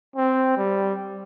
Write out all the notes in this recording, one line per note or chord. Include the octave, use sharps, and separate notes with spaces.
C4
G3